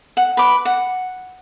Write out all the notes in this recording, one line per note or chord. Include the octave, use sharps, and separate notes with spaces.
F#5
B4 D6
F#5